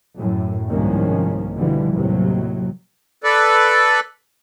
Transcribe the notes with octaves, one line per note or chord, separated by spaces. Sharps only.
F#2 A2
C2 G#2 D#3 F3 A#3 C#4
B2 D3 E3 F3 G3
D#2 A2 C3 F#3
A4 B4 D5